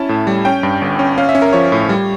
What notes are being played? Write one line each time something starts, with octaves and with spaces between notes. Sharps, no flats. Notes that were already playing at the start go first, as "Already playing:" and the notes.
Already playing: C#4 E4 A5
A2
G3
C#4 G5
G2
G1
C#4
C#4 F5
E5
C#4
A#4
F3 C#5
A2
G3